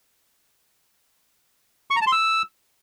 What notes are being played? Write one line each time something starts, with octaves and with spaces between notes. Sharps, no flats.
C#6
A#5
A5
C6
E6